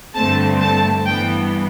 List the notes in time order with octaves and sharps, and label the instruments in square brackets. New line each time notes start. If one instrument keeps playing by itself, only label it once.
[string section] G2 D3 A3 C4 A5
A5
G2 E3 B3 G5